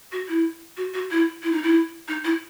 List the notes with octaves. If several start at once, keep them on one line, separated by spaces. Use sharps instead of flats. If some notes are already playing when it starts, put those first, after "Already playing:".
F#4
E4
F#4
F#4
E4
E4
D#4
E4
D#4
E4